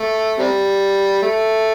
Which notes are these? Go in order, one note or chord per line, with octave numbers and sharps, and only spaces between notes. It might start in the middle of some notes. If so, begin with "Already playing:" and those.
Already playing: A3
C3 G3
A3